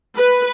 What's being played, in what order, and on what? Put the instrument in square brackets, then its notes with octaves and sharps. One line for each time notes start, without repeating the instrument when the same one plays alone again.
[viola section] B4